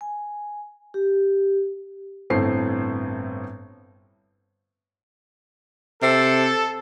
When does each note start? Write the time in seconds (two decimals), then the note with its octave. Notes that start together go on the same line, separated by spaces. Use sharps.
0.01 G#5
0.94 G4
2.30 G1 A2 C4 A4 C5 C7
6.03 C3 A4